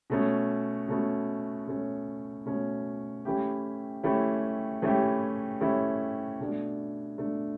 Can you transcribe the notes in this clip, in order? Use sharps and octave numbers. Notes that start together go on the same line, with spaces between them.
B2 A3 C#4
B2 A3 C#4
B2 A3 C#4
B2 A3 C#4
E3 A3 C#4 E4 G4
E3 A3 C#4 E4 G4
E3 A3 C#4 E4 G4
E3 A3 C#4 E4 G4
B2 A3 D4
B2 A3 D4